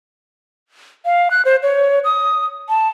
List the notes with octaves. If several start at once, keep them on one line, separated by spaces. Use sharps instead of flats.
F5
F#6
C5
C#5
D#6
A5